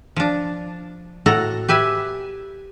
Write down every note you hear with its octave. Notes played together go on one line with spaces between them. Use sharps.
F3 D4
A2 F#4 A4 F#5 A#5
G4 B4 E5 G#5